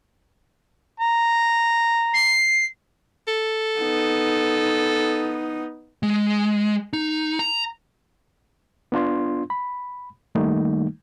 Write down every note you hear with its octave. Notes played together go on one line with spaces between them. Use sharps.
A#5
C7
A4
B3 D#4
G#3
D#4
A#5
B3 D4 F4 C6
B5
D#3 G3 A3 A#3 D#4